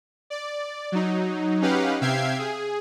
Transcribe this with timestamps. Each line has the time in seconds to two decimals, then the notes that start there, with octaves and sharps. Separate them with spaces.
0.30 D5
0.92 F#3 D#4
1.61 C#4 D#4 G4 B4 F5 F#5
2.01 C3 E5 F5 G5 G#6 C7
2.39 G#4